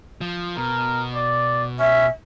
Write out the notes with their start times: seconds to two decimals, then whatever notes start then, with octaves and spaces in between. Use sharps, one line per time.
0.21 F3
0.57 B2 A#4
1.15 D5
1.79 C#4 E5